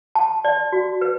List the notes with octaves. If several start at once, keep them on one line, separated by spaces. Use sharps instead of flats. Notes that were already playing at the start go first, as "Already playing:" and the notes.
A5
D5
F#4
B4